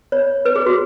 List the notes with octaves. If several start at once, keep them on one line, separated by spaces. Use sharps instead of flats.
C#5
B4
G#4
F#4